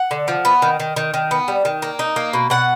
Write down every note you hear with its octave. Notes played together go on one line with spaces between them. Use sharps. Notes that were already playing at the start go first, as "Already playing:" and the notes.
Already playing: F#5
D3
F3
B3
D#3
D#3
D#3
D#3
B3
G3
D#3
A#3
D#4
A#3
B2
B2 F#5